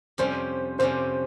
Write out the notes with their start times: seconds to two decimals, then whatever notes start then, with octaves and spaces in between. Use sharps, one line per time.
0.18 F2 C3 G3 C#4 C5
0.79 F2 C3 G3 C#4 C5